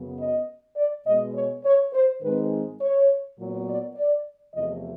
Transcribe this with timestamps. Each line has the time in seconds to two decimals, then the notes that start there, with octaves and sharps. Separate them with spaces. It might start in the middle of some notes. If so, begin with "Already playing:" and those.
Already playing: F#2 C#3 F#3 B3
0.18 D#5
0.76 D5
1.05 B2 G#3 B3 D#5
1.35 C#5
1.64 C#5
1.93 C5
2.22 G#2 D#3 G#3 C4 B4
2.80 C#5
3.38 A#2 F#3 B3
3.67 D5
3.96 D5
4.54 E2 C3 F3 A3 D#5